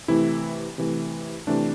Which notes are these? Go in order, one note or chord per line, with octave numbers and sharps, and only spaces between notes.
C3 E3 A3 E4
C3 E3 A3
C3 E3 A3 D4